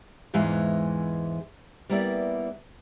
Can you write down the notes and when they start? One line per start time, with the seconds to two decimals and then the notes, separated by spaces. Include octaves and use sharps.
0.34 E2 G#2 E3 G#3 F5
1.89 G3 A#3 B3 E4 D5